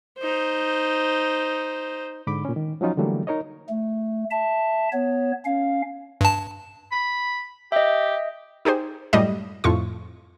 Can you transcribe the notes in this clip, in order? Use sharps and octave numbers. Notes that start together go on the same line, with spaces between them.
D#4 C5
G#2 D3 B5 D6
A#2 C#4
D#3
F3 F#3 C#4 D#4 F4
D3 E3 F#3 G3 A3 A#3
D#4 A#4 C#5 D#5
A3
E5 A5
B3 C#5
C#4 F5
G2 A5
B5
G4 D#5 E5
D#4 G4 G#4 C5
F#2 A2 G3 D#5
F2 A2 F4 C#6